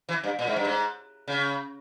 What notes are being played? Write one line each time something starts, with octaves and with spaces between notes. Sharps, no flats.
E3
G2
A#2
G#2
G2
G#2
C#3